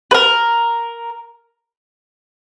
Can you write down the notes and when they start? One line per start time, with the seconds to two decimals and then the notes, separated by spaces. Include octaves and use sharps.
0.11 B4
0.14 A#4